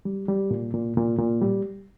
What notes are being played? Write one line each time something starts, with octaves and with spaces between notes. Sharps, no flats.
G3
G3
A#2
A#2
A#2
A#2
G3